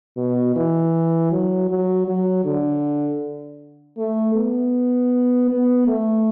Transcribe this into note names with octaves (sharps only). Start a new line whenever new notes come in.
B2
E3
F#3
F#3
F#3
D3
A3
B3
B3
A3